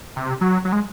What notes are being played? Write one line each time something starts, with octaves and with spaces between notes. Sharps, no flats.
C3
F#3
F#3
G#3